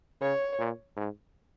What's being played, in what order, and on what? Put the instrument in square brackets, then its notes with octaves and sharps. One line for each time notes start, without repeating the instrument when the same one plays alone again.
[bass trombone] C#3 [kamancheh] C#5
[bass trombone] A#2
G#2